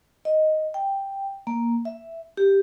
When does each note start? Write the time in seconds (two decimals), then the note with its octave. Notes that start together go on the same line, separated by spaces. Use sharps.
0.25 D#5
0.74 G5
1.47 A#3
1.85 E5
2.37 G4